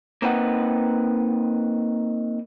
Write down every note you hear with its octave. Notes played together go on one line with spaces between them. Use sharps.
A#3 C4 D#4 B4 F#5